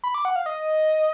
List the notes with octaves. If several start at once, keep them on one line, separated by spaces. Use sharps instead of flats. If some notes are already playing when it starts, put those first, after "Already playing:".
B5
D6
F#5
F5
D#5